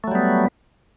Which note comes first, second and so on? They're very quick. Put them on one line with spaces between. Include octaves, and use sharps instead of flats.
A3 F#3 G3 B3